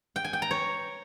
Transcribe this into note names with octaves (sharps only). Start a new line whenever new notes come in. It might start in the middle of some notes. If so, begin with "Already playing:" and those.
G5
G#5
G5
A#5
C#5